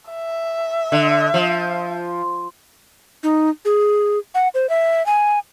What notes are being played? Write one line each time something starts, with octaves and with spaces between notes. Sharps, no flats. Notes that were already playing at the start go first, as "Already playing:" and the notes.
E5
D3
F3
D#4
G#4
F#5
C5
E5
G#5